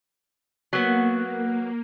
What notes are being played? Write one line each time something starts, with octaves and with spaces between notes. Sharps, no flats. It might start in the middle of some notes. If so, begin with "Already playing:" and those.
F#3 A#3 B3